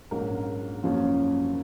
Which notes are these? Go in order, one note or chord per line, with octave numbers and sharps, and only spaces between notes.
A#1 G#2 F#3 C#4 A#4
F#1 F#2 F3 A#3 C#4